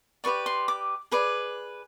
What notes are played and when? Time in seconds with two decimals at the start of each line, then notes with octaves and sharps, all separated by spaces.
0.24 G4 B4 D5 C#6
0.46 C6
0.68 D6
1.11 G#4 B4 D5